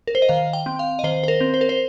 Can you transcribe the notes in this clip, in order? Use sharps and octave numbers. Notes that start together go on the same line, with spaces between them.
A#4
C5
D#5
D#3 F5
G5
C4
F5
D#5
D#3 C5
C5
A#4
C4
C5
A#4
C5